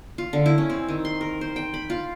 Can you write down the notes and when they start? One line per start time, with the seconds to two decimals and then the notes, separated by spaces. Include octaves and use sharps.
0.18 F4
0.33 D3
0.46 E4
0.58 C#4
0.70 C4
0.88 D#3
1.05 C6
1.21 A#4
1.41 C5
1.56 G5
1.74 B5
1.90 F4